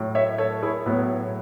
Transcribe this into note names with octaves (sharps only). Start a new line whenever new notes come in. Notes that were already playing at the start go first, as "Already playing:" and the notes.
Already playing: A2 F#3
C#5 E5
A4 C#5
E4 G#4
A2 F#3 B3